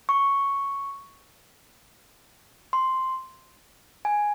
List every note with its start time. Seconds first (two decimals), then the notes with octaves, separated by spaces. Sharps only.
0.09 C#6
2.73 C6
4.05 G#5